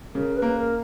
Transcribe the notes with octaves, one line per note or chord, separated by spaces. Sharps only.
C#3 A#4
B4
A#3
A#4